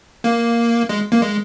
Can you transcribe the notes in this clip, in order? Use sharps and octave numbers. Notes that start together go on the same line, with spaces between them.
A#3
G#3
A#3
G#3